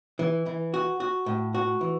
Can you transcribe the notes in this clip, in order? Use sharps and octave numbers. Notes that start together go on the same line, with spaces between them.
E3
E3
F#4
F#4
A2
F#4
E3